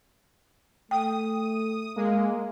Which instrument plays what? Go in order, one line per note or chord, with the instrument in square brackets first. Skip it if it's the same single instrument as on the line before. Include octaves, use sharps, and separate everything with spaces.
[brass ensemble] A3 [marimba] G5 [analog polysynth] D#6
[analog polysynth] G#3 [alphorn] A#3